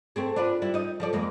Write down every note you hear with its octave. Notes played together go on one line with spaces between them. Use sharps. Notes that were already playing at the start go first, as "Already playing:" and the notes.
A3 C4 G#4
D4 F4 B4
G3 E4
D#4 D#5
F3 A4 D5
F2 G#3 A#3